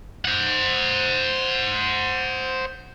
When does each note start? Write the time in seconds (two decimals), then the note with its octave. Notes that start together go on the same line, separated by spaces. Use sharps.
0.25 C5 F#5